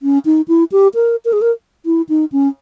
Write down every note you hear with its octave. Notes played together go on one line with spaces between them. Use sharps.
C#4
D#4
E4
G4
A#4
A#4
G#4
A#4
E4
D#4
C#4